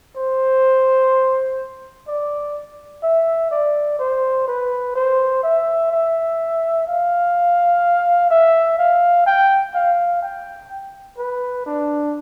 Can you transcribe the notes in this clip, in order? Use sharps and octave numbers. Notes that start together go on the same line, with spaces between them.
C5
D5
E5
D5
C5
B4
C5
E5
E5
F5
E5
F5
G5
F5
G5
B4
D4